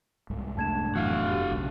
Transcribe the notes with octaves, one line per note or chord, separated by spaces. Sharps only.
C2 G#2
F1 A3 D4 A5 G#6 E7
F#2 A2 E3 F#4 F5 F#5 E6
G4
B1 C#3